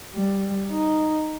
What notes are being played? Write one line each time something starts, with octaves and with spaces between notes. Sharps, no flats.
G3
D#4